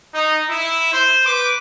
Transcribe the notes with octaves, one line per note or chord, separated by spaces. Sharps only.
D#4
E4
C5
B4 D6